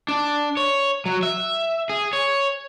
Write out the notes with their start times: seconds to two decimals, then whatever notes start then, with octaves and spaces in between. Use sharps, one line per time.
0.08 D4
0.57 C#5
1.06 F#3
1.23 E5
1.89 G#4
2.13 C#5